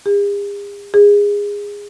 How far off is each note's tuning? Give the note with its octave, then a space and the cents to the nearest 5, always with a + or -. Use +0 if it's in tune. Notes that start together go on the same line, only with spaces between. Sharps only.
G#4 -45
G#4 -20